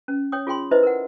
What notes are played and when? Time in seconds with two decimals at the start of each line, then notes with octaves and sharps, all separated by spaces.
0.08 C#4
0.32 C#5 G5 D#6
0.47 F4 G#4 G5 C6
0.71 D#4 E4 B4 C5 D#5 E5
0.83 A#4 F#5